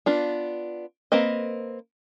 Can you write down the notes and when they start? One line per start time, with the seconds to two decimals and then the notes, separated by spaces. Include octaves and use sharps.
0.06 B3 D4 F4
1.12 A#3 C4 B4 D#5